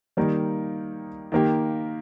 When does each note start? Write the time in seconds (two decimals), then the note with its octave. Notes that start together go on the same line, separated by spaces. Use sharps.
0.17 D#3 G3 A#3 D#4
1.32 D#3 A#3 G4